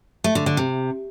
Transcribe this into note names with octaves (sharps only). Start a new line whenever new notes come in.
A3
D3
D3
C3